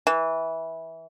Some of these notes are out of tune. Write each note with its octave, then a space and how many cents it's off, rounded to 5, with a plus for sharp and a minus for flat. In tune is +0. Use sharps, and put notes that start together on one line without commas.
E3 -15